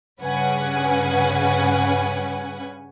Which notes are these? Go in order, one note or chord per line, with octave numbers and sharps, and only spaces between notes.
G2 C#3 C#4 B4 F#5 G#5